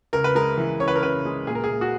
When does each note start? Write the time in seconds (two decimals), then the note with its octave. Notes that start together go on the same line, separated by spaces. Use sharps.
0.13 C#2 A#4
0.24 B4
0.35 G#3 A#4
0.57 E3
0.80 C#3 C#5
0.88 B4
0.96 A#4
1.03 C#2 B4
1.25 G#3
1.47 A#2 G#4
1.55 A#4
1.64 G#4
1.70 A#2
1.81 F#4